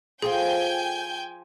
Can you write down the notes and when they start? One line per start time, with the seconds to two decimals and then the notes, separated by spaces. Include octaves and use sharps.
0.22 F3 F4 G#4 A4 C5 G5 G#5 G6